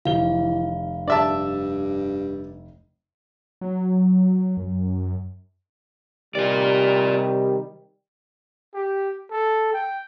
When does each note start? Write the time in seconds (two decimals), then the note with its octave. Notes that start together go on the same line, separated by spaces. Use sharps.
0.05 F1 D#3 E3 F5 G7
1.08 G2 D5 E5 A5
3.61 F#3
4.57 F#2
6.35 C3 D#3 G3 F4 D5
8.74 G4
9.31 A4
9.73 G5